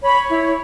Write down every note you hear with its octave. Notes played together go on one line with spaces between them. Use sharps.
C#5 B5
E4